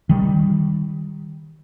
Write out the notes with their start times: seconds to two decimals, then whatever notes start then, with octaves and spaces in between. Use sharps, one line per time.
0.09 D#3 G3